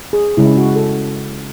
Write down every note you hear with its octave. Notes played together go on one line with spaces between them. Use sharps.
G#4
C#3 G#3 C#4 E4
F#4
A4